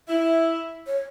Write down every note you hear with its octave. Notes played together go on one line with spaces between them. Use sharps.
E4 E5
C#5